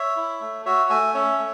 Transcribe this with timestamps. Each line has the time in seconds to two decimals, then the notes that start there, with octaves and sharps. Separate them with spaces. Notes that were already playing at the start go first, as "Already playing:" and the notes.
Already playing: C#5 E5
0.16 E4
0.41 A3
0.65 F#4 C#5 E5
0.90 A3 E5 G#5
1.14 C#4 C#5 E5
1.39 A3